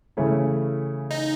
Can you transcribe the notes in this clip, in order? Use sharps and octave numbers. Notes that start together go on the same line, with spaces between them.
C#3 E3 A3 C#4 E4
D#4